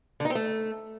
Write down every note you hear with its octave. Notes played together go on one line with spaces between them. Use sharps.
D3
D#4
C4
A3